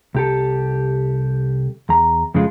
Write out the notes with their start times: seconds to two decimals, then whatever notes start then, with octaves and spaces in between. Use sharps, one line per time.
0.15 C2 G4 A4
1.89 E2 A#5
2.34 F2 C#3 F3 G#3 F4